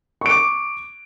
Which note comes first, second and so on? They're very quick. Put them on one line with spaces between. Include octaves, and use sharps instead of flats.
C#6 D7 D6